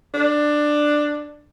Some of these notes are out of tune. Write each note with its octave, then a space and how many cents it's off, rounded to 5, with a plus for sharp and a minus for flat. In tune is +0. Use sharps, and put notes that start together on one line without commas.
D4 +10